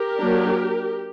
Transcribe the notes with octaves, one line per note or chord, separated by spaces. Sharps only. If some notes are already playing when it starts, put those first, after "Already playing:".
Already playing: G4 A#4
F#3 A#3 D4